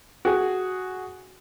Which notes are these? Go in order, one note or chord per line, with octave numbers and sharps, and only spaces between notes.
F#4 G#4